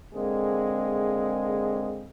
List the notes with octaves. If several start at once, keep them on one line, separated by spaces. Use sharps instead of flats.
D3 G#3 A#3 C4 G#4